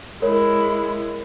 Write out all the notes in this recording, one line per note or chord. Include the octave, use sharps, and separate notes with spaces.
G#3 E4 A#4 C#5